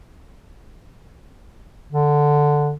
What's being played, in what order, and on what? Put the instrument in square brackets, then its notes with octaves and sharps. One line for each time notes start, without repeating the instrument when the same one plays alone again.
[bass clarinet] D3